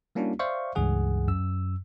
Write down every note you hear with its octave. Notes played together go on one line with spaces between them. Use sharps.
G3 A#3 C#4 D4 E4 F#4
C5 D5 E5 F5 C#6
C#2 G2 E3 G#4 F#5
F#2 E6